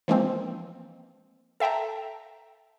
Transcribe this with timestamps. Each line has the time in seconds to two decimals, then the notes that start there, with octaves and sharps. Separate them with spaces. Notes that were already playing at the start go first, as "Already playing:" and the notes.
0.08 E3 F3 G#3 A#3 C4
1.60 A4 E5 G5 A5 A#5